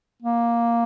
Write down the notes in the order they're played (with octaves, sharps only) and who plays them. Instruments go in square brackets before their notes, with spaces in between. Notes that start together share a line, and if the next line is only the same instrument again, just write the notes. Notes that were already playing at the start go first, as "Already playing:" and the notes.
[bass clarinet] A#3